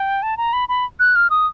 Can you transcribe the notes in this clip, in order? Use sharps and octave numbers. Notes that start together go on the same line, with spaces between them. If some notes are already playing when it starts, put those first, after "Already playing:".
Already playing: G5
A5
A#5
B5
B5
F#6
F6
D#6